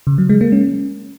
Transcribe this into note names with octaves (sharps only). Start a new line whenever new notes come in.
C#3
F#3
G#3
A#3
C#4